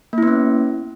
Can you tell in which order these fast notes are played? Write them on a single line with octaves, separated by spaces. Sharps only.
A#3 E4 B3 C#4